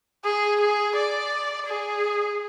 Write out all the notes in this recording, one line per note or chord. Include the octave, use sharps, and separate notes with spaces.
G#4
G#4
D5
G#4